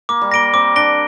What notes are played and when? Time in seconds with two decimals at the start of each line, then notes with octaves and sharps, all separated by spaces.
0.09 A#3 D6
0.21 G3
0.31 A#3 A#6 D7 G7
0.53 C4 D6
0.76 D4 A#6 D7 G7